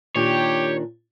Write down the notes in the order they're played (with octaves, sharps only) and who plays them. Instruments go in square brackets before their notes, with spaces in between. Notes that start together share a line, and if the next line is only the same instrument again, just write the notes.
[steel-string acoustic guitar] A#2 D#3 D4 [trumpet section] G4 [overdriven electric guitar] C#5